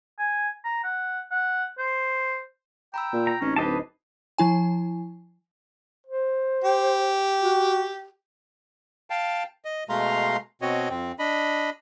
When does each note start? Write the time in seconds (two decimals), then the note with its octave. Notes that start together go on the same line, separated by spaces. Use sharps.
0.19 G#5
0.64 A#5
0.84 F#5
1.31 F#5
1.78 C5
2.94 G5 A#5 B5 E6
3.13 A#2
3.27 A#5
3.41 A1 C4 C#4 D#4
3.56 D1 G4 B4 C5 D#5 A5 C7
4.38 F3 E4 G#5
6.07 C5
6.64 G4
7.42 F#4
9.10 F5 G5 A5
9.65 D#5
9.89 B2 G#3 A3 F5 A#5 C6
10.62 B2 C4 F#4 C#5 D#5
10.90 F2 C4
11.19 D4 D#5 B5